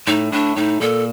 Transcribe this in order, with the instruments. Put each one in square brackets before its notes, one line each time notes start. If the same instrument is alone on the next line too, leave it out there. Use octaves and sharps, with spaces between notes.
[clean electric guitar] A2 [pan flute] D#4
[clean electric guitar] A2 [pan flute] D4
[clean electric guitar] A2 [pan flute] D#4
[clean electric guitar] A#2 [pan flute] A4